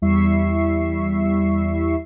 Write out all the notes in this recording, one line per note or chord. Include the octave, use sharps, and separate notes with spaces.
E2 G3 E4 E5 C#6 C7